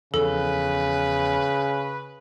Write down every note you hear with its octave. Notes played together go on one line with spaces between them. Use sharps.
E2 C#3 F3 A4 B4